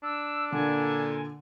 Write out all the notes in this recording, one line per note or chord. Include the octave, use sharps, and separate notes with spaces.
D4 E6
A#2 D3 A4 G#5